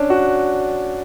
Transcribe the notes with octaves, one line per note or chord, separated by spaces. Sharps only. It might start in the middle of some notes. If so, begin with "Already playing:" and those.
Already playing: C#4 D4
F#4